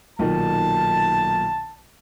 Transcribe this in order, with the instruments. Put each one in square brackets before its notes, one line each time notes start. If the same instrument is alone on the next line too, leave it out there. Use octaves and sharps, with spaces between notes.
[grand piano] B1 A#2 D#3 [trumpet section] A5